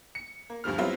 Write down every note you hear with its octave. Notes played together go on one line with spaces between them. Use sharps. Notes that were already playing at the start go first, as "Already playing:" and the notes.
C#7
A#3
D2 G2 F3 G3 F6
F#3 G3 B3 C4 E4 F4